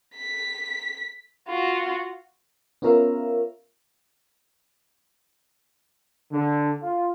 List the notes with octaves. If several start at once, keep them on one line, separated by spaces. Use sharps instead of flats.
B6
F4 F#4
B3 C#4 F4 A#4 E5 F5
D3
F4